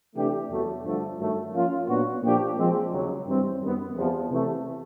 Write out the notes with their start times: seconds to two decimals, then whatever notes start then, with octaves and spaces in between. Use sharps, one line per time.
0.16 C3 E3 A3 D4 G4
0.50 E2 B2 F#3 A3
0.85 G2 D3 F3 A3
1.19 G2 D#3 F#3 A3
1.54 F3 A#3 C#4 F4
1.88 A#2 F#3 B3 D4 F#4
2.23 A#2 F3 A#3 D4 G4
2.58 F3 G#3 C4
2.93 D#2 C#3 F#3
3.27 G2 E3 G3 C4
3.61 F#2 D#3 G3 B3
3.96 E2 C3 F3
4.30 C3 E3 A3